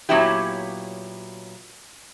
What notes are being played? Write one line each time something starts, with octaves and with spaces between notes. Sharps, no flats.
A#2 F#3 B3 C#4 E4 G4